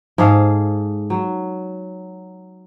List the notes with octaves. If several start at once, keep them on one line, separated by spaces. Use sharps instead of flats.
G#2 G#4 A4 F5
F#3